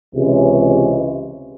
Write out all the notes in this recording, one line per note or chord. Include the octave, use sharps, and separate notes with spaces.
C#2 C3 E3 G#3 C#4